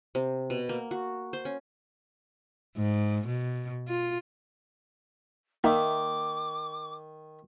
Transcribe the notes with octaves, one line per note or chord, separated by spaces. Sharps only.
C3
B2
A#3
F#4
C5
C#4
G#2
B2
F4
D#3 A#3 D#4 E5 D6